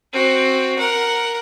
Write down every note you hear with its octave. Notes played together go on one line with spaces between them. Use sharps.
C4 F#4
A#4 F#5